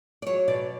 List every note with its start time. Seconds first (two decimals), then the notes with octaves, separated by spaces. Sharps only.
0.22 D5
0.27 F#3 C#5
0.48 B2 D5